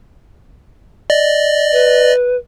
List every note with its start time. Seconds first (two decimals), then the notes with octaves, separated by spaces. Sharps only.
1.10 D5 D#5
1.72 B4